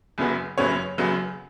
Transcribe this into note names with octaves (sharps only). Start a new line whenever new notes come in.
F#1 F#2 C#3 F#3 B3
F#1 F#2 C#3 F#3 B3 C#5
F#1 F#2 C#3 F#3 B3